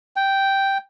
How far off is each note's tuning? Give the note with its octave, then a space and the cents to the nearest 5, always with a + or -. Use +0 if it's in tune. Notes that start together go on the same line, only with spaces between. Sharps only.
G5 -5